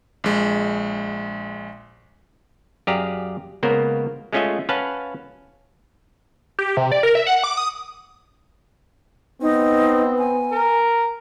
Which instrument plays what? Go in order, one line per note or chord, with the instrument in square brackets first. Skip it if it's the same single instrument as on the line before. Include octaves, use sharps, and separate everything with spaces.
[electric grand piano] A#1 G#3
[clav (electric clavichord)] F#2 G4 G#4 D5 F5 A#5
C#2 C#3 A#3 B3 A#4 C5
G#3 A3 C#4 F4 D#5 E5
C#4 B4 F5 F#5 A5
[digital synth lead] G4
C3
D5
A#4
E5
F#5
D6
D#6
[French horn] B3 [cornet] C4 [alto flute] D#4
[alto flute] G#5
[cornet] A#4